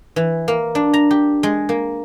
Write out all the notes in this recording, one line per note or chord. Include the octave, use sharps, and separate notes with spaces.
E3
A#3
D4
A#5
G4
G#3
A#3